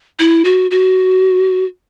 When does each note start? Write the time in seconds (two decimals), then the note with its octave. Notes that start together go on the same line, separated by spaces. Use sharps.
0.19 E4
0.45 F#4
0.71 F#4